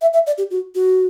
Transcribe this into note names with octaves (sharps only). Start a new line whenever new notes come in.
E5
E5
D5
G4
F#4
F#4